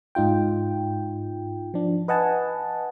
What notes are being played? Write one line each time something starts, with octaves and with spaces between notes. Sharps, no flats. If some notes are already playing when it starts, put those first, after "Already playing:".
G#2 D#4 F4 G5
F3 D4
B4 D#5 F#5 G#5 A5